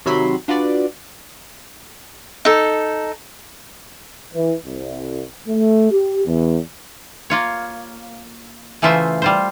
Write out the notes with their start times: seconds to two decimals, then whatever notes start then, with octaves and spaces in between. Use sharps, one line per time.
0.05 C3 D#3 F#3 E5 B5 C6
0.48 D4 F4 F#4 B4 D5
2.45 D#4 A4
4.33 E3
4.65 C2
5.48 A3
5.91 G4
6.26 E2
7.30 A#3 F4 C#5
8.82 C#3 E3 A3 F4 C5 E5
9.22 G3 F4 C5